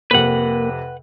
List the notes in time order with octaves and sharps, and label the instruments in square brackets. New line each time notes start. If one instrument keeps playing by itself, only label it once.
[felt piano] F2 C3 C4 [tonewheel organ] A#3 [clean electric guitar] B4 F#5